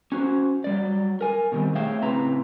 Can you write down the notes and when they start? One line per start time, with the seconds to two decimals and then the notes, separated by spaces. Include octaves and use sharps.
0.12 C#4 F#4 C5
0.64 F#3 G3 D5
1.21 A#4 G#5
1.52 B2 D#3 E3 G3 C4
1.75 A3 G#4 C#5 E5 F5 G5
2.01 A2 C#3 C4 B4 A#5